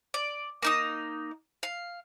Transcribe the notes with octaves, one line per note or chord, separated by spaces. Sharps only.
D5
A#3 D#4 D#6
F5